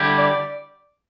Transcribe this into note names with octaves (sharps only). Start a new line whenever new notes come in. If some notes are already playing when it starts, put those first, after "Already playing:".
Already playing: D3 G3 E4 G4
D5